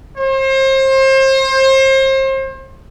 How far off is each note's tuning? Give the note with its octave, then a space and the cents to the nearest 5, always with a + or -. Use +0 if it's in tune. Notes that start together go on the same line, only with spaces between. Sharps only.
C5 +35